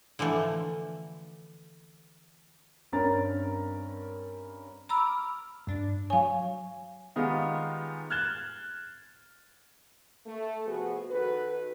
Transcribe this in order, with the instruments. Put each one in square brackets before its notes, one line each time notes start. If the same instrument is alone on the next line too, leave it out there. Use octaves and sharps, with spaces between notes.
[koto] D3 E3 F3 A3
[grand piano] G2 C4 C#4 A#4 A#5 A6
[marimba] A#5 B5 E6 [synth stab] D6 F6
[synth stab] G2 D4
[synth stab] F#3 C#5 [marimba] F5 G#5
[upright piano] D#3 G3 G#3 B3 D#4 F4
F6 F#6 G#6 A6 E7 G7
[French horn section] A3
C3 F3 B3 F#4 G#4
D#3 F#4 A4 B4